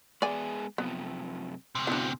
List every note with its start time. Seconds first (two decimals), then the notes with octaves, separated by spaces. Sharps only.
0.22 G#3 B3 G#4 D5 G#5
0.78 F#2 C3 F3 B3
1.75 D2 C3
1.87 B3 D4 E4 F#4